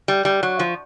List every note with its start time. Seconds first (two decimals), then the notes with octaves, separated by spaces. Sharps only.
0.08 G3
0.25 G3
0.43 F#3
0.59 F3